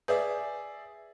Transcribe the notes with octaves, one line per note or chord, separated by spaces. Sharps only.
G#4 B4 D5 E5